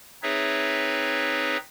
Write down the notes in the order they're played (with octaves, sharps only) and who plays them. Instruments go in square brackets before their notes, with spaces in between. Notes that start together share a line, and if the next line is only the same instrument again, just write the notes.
[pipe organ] C4 D#4 G#4 B4 C#5 E5